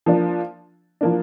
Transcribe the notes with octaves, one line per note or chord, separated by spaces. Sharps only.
F3 A#3 D4
F3 A#3 D4